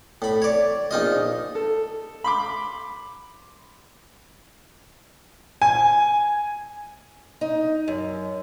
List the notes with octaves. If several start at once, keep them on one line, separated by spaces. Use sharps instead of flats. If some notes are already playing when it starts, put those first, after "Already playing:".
A2 B5
C#5 D5
A#1 D#4 F4 D#5
A4
B5 C6 D6
G#5
D#4
F#2